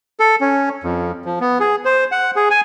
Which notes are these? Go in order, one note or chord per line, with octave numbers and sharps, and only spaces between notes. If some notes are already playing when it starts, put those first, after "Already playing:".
A4
C#4
F2
F3
B3
G#4
C5
F#5
G#4
G#5